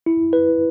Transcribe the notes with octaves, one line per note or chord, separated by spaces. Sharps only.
E4
B4